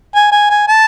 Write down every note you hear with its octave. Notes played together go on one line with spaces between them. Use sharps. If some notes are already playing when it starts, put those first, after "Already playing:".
G#5
G#5
G#5
A5